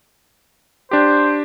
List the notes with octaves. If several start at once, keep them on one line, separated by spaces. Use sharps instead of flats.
D4 G4 C5